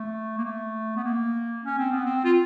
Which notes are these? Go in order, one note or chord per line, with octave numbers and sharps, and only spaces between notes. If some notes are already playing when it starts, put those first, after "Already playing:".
Already playing: A3
A#3
A3
B3
A#3
C#4
C4
B3
C4
F4